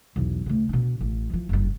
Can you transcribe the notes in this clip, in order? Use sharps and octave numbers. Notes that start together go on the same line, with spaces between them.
B1 E2
D2 C#3
B2 D4
A1
E3 F3
F#1 G2